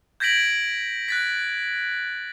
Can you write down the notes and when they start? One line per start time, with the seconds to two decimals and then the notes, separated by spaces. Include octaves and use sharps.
0.20 G6 G#6 A#6 B6 D7 F#7
1.08 F#6 A6 B6